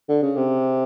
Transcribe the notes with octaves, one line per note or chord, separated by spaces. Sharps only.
D3
C#3
C3